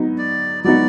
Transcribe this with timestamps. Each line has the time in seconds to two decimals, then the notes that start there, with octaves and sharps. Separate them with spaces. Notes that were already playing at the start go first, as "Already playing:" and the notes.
Already playing: F#3 B3 D#4
0.18 D5
0.64 F#3 B3 D#4 D5